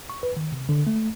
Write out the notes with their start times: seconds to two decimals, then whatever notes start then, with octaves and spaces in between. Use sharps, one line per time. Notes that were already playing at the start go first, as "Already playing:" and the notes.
0.10 C#6
0.23 B4
0.37 D#3
0.52 C3
0.69 D3
0.87 A3